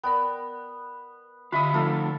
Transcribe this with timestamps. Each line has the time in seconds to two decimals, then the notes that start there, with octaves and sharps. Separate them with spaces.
0.04 B3 A#4 D5 G5
1.52 D3 F4 G4 E5 B5 D#6
1.74 F3 A3 D#4 F4 A4 E5